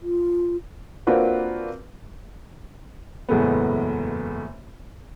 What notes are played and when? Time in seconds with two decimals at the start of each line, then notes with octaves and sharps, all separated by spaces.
0.02 F4
1.07 A#3 C4 D4 F4 F#4 B4
3.29 F#1 E2 A2 G#3 A3 B3